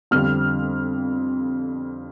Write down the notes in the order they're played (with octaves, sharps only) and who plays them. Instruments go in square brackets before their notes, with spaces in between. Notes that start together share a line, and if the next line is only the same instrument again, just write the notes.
[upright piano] F2 D3 G3 C4 F6